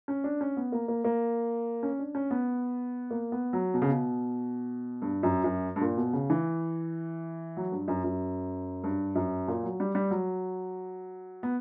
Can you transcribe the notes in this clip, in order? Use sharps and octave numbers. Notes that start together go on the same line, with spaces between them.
C#4
D4
C#4
B3
A#3
A#3
A#3
C#4
D4
C#4
B3
A#3
B3
F#3
B2
C#3
B2
G2
F#2
F#2
G2
A#2
B2
C#3
E3
F#3
G2
F#2
F#2
G2
F#2
A#2
F#3
G3
G3
F#3
B3